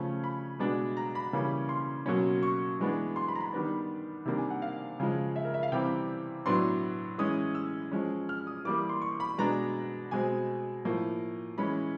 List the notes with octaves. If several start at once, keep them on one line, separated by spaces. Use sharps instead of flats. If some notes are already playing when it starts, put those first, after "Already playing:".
Already playing: C#3 F3 A3 C#4
B5
B2 G#3 B3 D4
A#5
B5
C#3 E3 G3 A#3 C#4
C6
B2 F#3 A#3 C#4
C#6
E3 G#3 B3 D4
C6
B5
A#5
B5
D#3 G3 B3 D4
C3 D#3 G3 A#3 D4
G#5
F#5
F5
C#3 F3 G#3
E5
A#4
E5
F5
C3 E3 G3 C4 G5
A2 F#3 B3 D4 C6
E3 G#3 C#4 D#6
E6
F3 G#3 C#4
F6
D#6
E3 G3 A#3 D6
C6
C#6
B5
B2 G#3 B3 D4 A#5
B2 G#3 C4 G#5
A2 F3 A#3
E3 G#3 C#4 B5